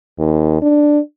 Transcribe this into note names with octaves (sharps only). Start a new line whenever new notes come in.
D#2
D4